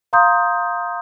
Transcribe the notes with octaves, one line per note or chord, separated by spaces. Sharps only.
F5 A#5 C6 D#6 G6